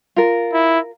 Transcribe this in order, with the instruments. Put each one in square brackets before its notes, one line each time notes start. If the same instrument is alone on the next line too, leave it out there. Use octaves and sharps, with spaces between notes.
[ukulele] F4 A#4
[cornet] E4